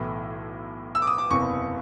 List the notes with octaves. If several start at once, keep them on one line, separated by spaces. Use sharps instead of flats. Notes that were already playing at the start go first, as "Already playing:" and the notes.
Already playing: B1 A2 E3
E6
D6
D#6
D6
F#1 E2 C3 E3 C#6